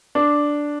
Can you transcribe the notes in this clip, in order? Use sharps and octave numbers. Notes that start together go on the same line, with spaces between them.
D4